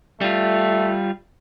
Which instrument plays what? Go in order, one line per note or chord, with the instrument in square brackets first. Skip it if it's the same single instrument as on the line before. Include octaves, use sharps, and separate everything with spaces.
[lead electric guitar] G3 F4 [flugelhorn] A3